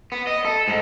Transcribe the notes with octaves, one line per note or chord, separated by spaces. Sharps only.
B3
D#5
A4
G#2